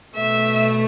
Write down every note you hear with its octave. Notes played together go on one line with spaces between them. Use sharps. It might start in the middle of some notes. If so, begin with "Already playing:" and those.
B2 A3 E5